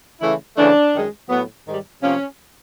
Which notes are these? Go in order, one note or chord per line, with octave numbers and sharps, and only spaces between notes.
C#3 E3 A3 E4
C#3 E3 A3 D4
F#2 D#3 G#3
A2 F#3 B3
G#2 D#3 G3
C3 F3 A#3 C#4